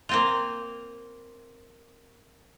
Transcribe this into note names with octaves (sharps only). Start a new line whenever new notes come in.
A#3 C4 F4